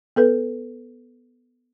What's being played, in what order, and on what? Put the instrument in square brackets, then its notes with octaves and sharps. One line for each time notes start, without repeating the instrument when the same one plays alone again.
[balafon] B3 A4 B4